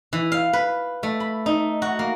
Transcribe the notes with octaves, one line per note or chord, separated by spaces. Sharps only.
E3
F5
B4
A3
B5
D#4
F#4
A#3